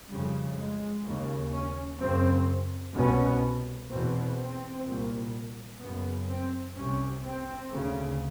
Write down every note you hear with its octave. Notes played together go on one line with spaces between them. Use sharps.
F2 C#3 G3
G#3
D#2 C#3
C#4
F#2 C#3 C4
C2 B2 C#4
E2 B2 C4
C4
C2 A#2
F#2 C#3 B3
C4
C2 C3 C#4
C4
D2 C#3